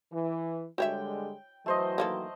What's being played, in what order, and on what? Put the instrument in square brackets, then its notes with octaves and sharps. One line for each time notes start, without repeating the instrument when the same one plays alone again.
[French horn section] E3
[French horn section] D3 G3 G#3 [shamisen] F#4 C#5 E5 [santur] G5
[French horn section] E3 F#3 [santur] A3 C5 D#5
[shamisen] D#3 A#3 A4